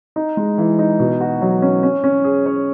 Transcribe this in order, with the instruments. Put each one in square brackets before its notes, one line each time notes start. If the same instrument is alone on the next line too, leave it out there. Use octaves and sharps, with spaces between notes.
[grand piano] D#4
G#3
E3
D#4
B2
F#4
F#3
C#4
C#4
C#4
G#4
C#5